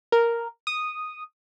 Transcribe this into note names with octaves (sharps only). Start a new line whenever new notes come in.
A#4
D#6